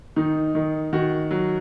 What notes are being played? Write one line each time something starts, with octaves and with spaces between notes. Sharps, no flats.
D#3 D#4
D#3
D#3 F#4
F#3